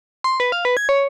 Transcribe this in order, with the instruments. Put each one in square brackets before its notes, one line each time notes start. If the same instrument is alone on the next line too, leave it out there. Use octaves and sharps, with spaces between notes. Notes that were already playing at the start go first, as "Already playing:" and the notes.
[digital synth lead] C6
B4
F5
B4
G#6
C#5